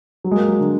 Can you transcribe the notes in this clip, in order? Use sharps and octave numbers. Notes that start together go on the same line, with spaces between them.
F#3
G#3
A#3
F#3
D3